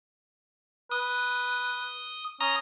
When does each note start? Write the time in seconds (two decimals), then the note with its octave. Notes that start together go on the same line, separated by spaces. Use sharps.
0.91 B4 D#6
2.41 C#4 A#5 D#6